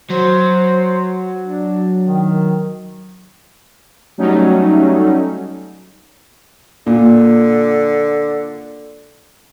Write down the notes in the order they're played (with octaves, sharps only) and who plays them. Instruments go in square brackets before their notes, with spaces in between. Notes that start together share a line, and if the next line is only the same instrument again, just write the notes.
[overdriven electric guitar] F#3 [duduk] C5
[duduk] D4
D#3
[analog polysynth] F#3 G3 A3 C#4 D#4
[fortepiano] A#2 [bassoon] D3